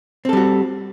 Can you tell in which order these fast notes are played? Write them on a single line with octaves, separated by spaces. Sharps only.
C4 A4 G3 F#4